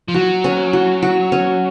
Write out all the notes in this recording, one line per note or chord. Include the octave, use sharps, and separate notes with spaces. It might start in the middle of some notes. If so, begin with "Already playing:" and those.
F3
F#3 F#4
C#4
F#4
F#4
C#4